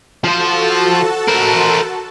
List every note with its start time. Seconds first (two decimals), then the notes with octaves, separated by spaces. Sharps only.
0.24 F3 F#4 A4 C5 A5
1.28 A#4 C5